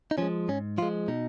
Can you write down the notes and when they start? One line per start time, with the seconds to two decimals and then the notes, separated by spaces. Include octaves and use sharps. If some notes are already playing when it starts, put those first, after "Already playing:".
0.11 D#4
0.18 F3 G#3 C#4
0.48 G#2 C#4
0.78 F3 F4
0.82 G#3
1.08 B2 D#4